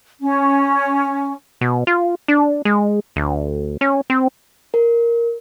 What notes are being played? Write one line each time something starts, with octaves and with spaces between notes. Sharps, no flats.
C#4
B2
F4
D4
G#3
D2
C#4
C4
A#4